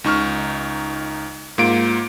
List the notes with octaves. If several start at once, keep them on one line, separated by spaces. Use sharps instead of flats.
C#2 D#4 C#6 F6
G#2 A#3 F4 D7